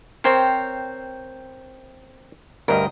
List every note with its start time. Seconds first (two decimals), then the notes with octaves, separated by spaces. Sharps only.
0.24 C4 A#4 C5 C#5 G5
2.68 D2 G2 A#4 D#5